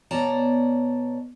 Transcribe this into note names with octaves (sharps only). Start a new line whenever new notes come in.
B2 C#5 D5 A5 A#5